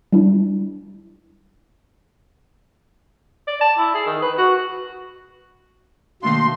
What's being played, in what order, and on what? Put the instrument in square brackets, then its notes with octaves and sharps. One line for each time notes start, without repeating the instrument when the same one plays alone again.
[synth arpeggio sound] G3 D4 E4
[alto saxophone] D5
A5
E4
G#4
D#3
B4
F#4
[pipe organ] B2 A#3 [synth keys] D#3 A3 D4 [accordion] C6